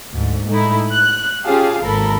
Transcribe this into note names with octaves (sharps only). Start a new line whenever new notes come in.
D2 G#2
A2 G#3 A3 D#4 E4
F#6
C#4 F4 G4 G#4 F5 A5
G#1 D#2 A4 A#4 B5